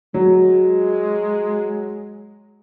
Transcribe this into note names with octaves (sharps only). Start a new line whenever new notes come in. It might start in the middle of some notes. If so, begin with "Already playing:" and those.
F#3 G#3